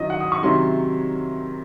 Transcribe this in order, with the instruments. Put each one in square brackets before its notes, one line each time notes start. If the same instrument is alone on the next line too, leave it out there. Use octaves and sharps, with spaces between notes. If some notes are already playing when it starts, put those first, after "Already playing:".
Already playing: [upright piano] D#3 F#3 C#4 E4 D#5
F#5
D#6
C#6
C3 D#3 F#3 C#4 E4 C6